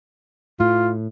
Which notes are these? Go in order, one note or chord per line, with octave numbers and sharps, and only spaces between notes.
A2 F4